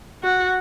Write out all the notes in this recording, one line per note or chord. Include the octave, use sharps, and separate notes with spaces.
F#4